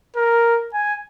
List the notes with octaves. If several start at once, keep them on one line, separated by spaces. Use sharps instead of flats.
A#4
G#5